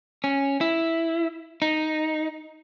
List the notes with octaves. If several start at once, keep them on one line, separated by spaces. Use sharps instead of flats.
C#4
E4
D#4